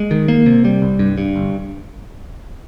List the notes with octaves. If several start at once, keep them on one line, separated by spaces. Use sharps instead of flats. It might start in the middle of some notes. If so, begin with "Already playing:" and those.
Already playing: G#3
D#3
A#3
C3
G3
C2
G2
G2
G1